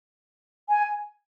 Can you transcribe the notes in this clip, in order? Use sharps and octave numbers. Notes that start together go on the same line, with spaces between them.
G#5